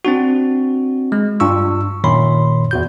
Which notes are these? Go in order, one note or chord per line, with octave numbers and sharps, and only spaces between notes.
C4 D4 F#4
G#3
G2 D4 F4 C#6 E6
F#2 A#2 D#3 C#5 B5 C6
E2 F#4 G6